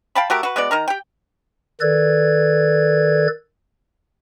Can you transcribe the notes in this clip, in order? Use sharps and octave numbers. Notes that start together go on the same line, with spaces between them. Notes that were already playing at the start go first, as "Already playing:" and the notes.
F5 G5 A5 B5
A3 F#4 G4 A#4
F#4 B4
G#3 B3 F#4 D5
D#3 A#4 A#5
G4 G5
D#3 A4 B4 D5 G#6